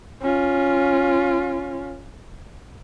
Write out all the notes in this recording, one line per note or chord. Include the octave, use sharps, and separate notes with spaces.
C#4 F4